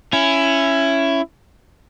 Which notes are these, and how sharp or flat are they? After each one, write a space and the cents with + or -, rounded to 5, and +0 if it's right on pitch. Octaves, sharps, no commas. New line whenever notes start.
C#4 +0 E4 +15